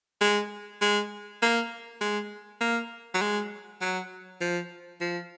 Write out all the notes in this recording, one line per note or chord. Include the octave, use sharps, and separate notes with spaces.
G#3
G#3
A#3
G#3
A#3
F#3
G#3
F#3
F3
F3